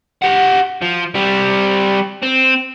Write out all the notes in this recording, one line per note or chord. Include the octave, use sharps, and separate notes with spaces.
G4 F#5
F3
G3 C4
C4